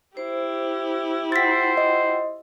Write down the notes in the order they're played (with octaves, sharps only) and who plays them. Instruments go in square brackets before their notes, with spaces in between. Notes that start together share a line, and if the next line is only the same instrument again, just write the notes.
[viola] E4 G4 [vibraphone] C5
[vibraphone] F4 F#5 G5 [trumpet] C5 [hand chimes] A6 B6
[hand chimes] D#5